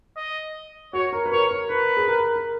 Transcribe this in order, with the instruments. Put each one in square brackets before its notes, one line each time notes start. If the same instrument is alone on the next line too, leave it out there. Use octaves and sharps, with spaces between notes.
[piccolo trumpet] D#5
[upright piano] F#4 [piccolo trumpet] C#5
[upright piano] A#4
B4
[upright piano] A#4 [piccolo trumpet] C#5
[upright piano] A#4
[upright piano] A#4 [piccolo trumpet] B4
[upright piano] G#4
A#4
A#4